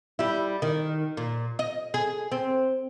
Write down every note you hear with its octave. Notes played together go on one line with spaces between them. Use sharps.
G3 E4
D#3
A#2
D#5
G#4
C4